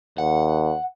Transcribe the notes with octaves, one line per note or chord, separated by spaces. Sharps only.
D#2 F#5